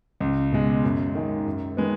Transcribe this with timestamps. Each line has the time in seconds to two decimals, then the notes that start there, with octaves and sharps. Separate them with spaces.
0.20 C#2
0.52 B2 G#3
0.84 F#2
1.15 D#3 G#3
1.46 F#2
1.77 D#3 G#3 B3